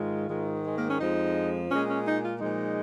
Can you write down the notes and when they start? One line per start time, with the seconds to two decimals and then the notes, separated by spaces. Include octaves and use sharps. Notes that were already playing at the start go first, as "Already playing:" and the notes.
Already playing: G#2 D#3 G#3 F4
0.29 G#2 D#3 G#3
0.65 G#3
0.77 A#3
0.88 C#4
1.00 F2 F3 G#3 D#4
1.70 A#2 G#3 C#4
1.88 C#4
2.06 D#4
2.23 F4
2.41 A#2 F3 G#3 D#4